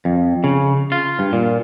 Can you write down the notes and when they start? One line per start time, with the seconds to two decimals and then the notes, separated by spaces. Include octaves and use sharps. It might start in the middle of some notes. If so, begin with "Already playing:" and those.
0.05 F2
0.44 C#3
0.92 F4
1.19 G2
1.33 A#2